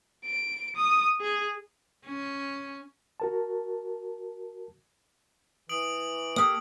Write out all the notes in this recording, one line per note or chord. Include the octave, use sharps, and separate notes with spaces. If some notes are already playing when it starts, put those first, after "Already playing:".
D7
D#6
G#4
C#4
F#4 A#4 A5
E3 D#6 D7 F#7
A#3 G4 A4 D#6